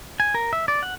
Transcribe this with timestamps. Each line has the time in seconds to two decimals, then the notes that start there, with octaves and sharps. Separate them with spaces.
0.20 G#5
0.35 A#4
0.53 E5
0.68 D5
0.83 F#5